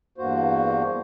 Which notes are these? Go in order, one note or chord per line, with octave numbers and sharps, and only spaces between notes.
E2 G2 A#3 F#4 C5